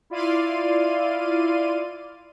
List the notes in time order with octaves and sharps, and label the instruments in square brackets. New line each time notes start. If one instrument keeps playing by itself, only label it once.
[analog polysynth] E4 F4 D5 F5 C6 D#7